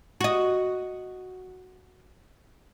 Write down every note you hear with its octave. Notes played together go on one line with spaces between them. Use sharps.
F#4 D#5